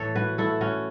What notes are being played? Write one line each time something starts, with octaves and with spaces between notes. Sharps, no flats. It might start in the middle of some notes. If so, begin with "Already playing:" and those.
Already playing: A2 E3 A4 C#5
F#4 B4
A3 E4 A4
C#4 F#4